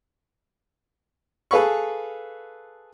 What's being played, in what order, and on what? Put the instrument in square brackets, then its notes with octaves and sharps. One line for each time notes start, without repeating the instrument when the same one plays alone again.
[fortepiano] G#4 A4 B4 F5 B5 C#6